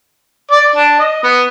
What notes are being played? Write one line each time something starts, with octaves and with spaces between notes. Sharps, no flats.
D5
D4
D#5
B3